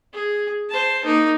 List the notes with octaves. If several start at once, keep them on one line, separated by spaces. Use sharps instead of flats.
G#4
C5 A5
A#3 D#4